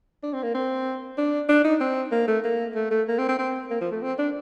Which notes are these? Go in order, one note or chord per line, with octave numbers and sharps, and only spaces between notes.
D4
C4
A#3
C4
D4
D4
D#4
C4
A#3
A3
A#3
A3
A3
A#3
C4
C4
C4
A#3
F3
A3
C4
D4